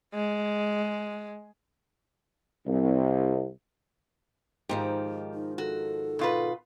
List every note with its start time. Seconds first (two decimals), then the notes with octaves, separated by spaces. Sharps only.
0.14 G#3
2.66 C2
4.69 G#2 D#3 F3 G4
5.34 D#4
5.58 F#4 A4
6.19 B2 F4 B4